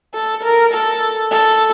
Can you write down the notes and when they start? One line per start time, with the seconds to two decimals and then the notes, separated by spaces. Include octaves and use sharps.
0.14 A4
0.44 A#4
0.73 A4
1.31 A4